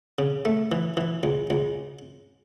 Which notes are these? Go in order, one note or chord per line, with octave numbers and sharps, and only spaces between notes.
C#3
A3
E3
E3
C#2
C#2